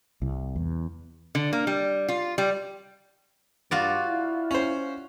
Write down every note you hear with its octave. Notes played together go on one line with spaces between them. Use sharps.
C2
E2
D3
A#3
G3
F4
G3
G2 F4 F#4 D5
E4
C#4 C5